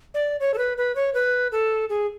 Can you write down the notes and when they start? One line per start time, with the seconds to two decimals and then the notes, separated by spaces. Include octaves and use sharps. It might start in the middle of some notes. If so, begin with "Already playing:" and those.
0.14 D5
0.40 C#5
0.54 A4
0.58 B4
0.78 B4
0.96 C#5
1.14 B4
1.52 A4
1.89 G#4